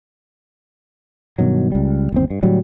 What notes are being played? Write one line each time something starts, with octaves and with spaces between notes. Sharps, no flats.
G2 B2 D#3 F#3
C#2 G3
G1 D#2 C4
G2
A2 D3 F#3 G3